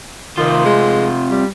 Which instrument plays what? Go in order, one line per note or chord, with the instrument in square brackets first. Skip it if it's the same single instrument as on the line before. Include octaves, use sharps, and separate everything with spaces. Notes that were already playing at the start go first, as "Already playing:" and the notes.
[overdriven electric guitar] C3 F4 [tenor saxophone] D#3
[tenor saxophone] G#3
G3